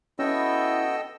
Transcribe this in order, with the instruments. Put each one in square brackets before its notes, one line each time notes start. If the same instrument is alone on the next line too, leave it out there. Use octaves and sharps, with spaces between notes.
[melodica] B3 F#4 G5 [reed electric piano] C#4 [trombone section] E4 [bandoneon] A4 D#5 E6